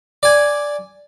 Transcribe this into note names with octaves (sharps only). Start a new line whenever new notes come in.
D5 G#5